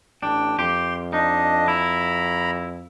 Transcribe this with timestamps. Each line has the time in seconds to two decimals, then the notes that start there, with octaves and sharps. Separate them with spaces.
0.23 A1 D4 G5
0.59 F2 G4 C6
1.13 D4 D#4 D#5
1.68 E4 A#5 B5